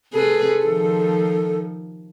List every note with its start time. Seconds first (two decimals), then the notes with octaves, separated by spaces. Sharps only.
0.13 C3 G#4 A4 B4
0.65 D#3 F3